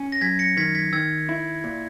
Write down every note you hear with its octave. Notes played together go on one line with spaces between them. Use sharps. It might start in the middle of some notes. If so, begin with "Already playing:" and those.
Already playing: C#4
A#6
F#2 G#6 B6
A#6 C#7
D#3 G#6 B6
G#6 B6
D#3 E6 G#6
E4
A#2